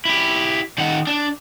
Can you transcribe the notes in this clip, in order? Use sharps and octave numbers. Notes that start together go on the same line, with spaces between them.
E4 G4
D#3 F#5
D4